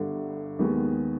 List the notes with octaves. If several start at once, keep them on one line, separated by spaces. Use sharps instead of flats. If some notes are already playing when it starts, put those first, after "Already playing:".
Already playing: G1 G2 D3
D#2 D#3 G#3 B3